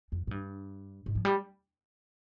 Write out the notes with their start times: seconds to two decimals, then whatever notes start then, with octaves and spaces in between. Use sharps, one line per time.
0.12 F2
0.27 G#2
0.31 G2
1.06 G#2
1.15 F3
1.25 G3